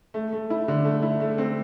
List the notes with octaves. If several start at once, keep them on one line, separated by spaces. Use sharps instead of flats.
A3
A3
E4
D3
A3
E4
A3
C4